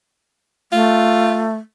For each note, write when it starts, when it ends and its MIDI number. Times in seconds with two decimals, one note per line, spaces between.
0.72 1.55 57
0.72 1.47 65